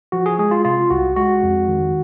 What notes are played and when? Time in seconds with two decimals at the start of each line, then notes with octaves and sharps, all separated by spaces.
0.12 F3 F#4
0.26 G#4
0.39 G#3 G#4
0.51 F4
0.65 C3 F4
0.91 C2 F#4
1.17 G#3 F#4
1.43 F2
1.68 D#3